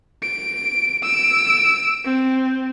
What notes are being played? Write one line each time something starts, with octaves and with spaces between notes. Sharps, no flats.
D7
E6 D7
C4